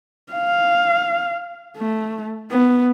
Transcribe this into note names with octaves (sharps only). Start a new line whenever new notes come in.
F5
A3
B3